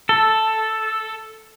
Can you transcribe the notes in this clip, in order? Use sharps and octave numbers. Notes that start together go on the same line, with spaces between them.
A4